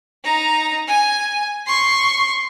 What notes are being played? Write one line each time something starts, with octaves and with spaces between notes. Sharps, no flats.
D#4 A#5
G#5
C6 C#6